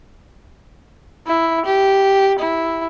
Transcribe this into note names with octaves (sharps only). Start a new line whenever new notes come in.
E4
G4
E4